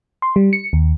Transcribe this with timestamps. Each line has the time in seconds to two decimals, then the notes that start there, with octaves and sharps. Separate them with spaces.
0.22 C6
0.36 G3
0.53 C#7
0.73 D#2